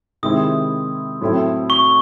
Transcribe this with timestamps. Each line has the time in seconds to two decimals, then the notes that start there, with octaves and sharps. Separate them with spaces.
0.23 C3 D#3 G#3 C4 E4 D#6
1.21 A2 F#3 A3 C4 E4
1.70 C#6